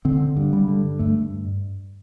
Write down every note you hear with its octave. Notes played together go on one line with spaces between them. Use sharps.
D3 C4
G2
G3
D3
G2 A3